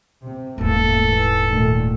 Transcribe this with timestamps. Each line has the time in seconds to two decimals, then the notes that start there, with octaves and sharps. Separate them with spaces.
0.24 C3
0.58 D#1 A1 G#2 A3 A#3 A4
1.06 E3
1.51 A#2 D#3 A3